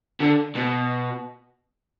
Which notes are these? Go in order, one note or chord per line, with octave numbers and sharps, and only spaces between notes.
D3
B2